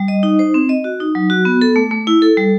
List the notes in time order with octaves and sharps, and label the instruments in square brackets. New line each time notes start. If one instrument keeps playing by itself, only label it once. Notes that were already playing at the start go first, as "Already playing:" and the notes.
Already playing: [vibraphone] G3
D#5
D#4
C5
C4
D#5
F#4
D#4
F#3
F#4
B3
A4
A3
A3
E4
A4
G3